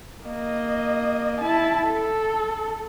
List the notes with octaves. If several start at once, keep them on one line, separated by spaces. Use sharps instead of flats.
A#3 D#5
E4 A5
A4